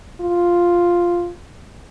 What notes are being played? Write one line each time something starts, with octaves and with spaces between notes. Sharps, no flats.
F4